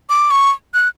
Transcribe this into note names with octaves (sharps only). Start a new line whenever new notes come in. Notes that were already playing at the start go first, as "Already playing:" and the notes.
D6
C#6
F#6